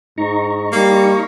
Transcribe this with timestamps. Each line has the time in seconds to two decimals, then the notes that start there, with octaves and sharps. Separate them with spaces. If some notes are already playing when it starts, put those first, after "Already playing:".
0.18 G#2 D#4 A#5 C#6
0.73 G3 A#3